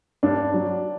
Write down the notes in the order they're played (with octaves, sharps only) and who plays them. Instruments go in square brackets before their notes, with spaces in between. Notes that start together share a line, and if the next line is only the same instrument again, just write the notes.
[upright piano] G2 D4
F#3